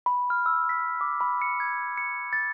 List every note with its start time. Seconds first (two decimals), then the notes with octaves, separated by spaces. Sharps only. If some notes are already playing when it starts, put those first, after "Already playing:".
0.06 B5
0.30 F6
0.46 E6
0.69 B6
1.01 D6
1.21 B5
1.42 C#7
1.60 G#6
1.97 C#7
2.33 A6